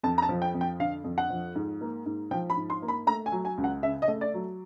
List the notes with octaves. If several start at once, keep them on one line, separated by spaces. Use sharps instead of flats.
F2 A5
A#5
A5
F3
G5
F2
G5
D3 F5
F2
F#5
F3
G#2
A#3
G#2
F3 G5
B5
G#2
C6
A#3
B5
A3 A#5
G#5
F#3
G#5
C#2
F#5
C#3 E5
D#5
A3
D5
F#3